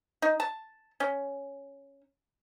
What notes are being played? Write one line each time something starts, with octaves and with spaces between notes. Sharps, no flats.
D#4
A5
C#4